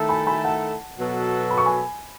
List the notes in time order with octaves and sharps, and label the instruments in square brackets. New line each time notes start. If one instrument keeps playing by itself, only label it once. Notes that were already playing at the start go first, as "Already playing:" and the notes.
Already playing: [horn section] D#3 A3 E4 A4
[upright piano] G#5 B5
G#5 B5
F#5 A5
[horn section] B2 F#3 B3 F#4 A4
[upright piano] B5
C#6
G#5 B5